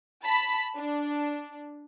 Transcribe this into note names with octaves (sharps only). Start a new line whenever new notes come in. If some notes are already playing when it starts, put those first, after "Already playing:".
A5 B5 B6
D4